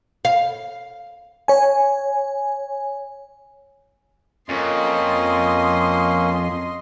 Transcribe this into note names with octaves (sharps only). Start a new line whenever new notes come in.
F5
C#5 G#5
F2 A#3 C#4 D#5 C6